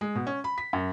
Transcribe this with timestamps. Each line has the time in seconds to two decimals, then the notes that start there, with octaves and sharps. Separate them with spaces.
0.01 G#3
0.15 B2
0.27 C#4
0.44 B5
0.58 B6
0.73 F#2